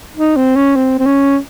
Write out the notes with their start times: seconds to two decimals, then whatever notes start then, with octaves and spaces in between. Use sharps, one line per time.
0.17 D#4
0.36 C4
0.56 C#4
0.76 C4
0.99 C4
1.06 C#4